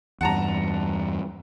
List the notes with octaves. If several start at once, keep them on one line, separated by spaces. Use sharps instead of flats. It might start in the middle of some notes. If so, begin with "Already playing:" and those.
E2 G2 F#5 A5 A#5